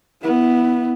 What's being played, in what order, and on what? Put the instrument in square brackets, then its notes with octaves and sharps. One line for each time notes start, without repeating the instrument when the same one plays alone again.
[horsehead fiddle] B3 E4